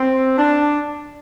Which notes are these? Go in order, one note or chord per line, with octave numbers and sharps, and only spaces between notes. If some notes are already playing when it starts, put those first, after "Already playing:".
Already playing: C4
D4